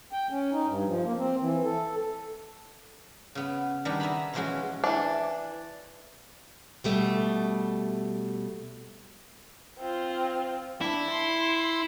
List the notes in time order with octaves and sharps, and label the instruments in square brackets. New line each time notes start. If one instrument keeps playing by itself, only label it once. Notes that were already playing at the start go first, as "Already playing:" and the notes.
[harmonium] G5
C#4
D#4
G2
F3
A#3
C4
E3
A4
[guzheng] C#3 B3
D#3 G3 B3 D4
D#5 E5 G#5 A#5 B5
B2 E3 F3 G#3 C#4 F#4
[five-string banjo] E3 D4
[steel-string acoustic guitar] B2 G3 A3
[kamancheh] C4 F4
[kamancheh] D4 [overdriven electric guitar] E4
[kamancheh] C6